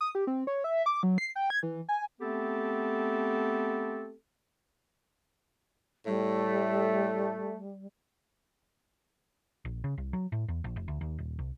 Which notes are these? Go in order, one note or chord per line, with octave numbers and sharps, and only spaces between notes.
D#6
G4
C4
C#5
E5
D6
F#3
C7
G5
G#6
E3
G#5
A3 B3 C4 G4 A4
A2 G3 A3
A#1
C#3
C2
F#3
A2
E2
A#1
F1
D2
D#2
D#1
C2